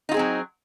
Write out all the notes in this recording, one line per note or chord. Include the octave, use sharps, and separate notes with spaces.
F#3 C4 D#4 F4 G#4